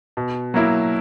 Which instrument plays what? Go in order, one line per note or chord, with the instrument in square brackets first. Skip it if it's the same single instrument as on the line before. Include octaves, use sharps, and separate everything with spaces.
[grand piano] B2
F#3 A#3 E4